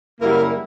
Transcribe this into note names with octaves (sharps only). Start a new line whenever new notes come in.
F#2 C#3 G3 A#3 E4 A#4